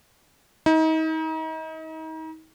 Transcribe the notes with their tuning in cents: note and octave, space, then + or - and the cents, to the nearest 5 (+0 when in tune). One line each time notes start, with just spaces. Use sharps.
D#4 +35